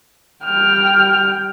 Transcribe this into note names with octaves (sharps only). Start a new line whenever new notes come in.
G3 G5 F6